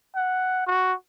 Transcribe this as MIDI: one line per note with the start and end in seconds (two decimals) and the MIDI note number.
0.15 0.64 78
0.67 0.93 66